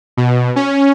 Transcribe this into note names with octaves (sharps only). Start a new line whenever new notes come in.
B2
C#4